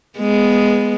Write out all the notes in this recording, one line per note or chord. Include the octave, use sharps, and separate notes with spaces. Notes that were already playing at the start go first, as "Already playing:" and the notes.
G#3 B3